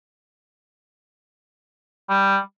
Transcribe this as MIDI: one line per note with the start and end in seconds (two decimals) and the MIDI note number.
2.09 2.37 55